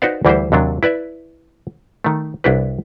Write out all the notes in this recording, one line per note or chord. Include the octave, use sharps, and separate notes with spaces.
D#4 F#4 B4 C5 D5 F5
D2 E3 G3 E4 A#4 C5
D#2 C3 F#3 D4
E4 B4 D5 E5
D#3 A3
C2 D4 E4 G4 B4